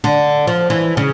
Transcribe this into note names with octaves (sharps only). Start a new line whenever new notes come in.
D3
F3
E3
C#3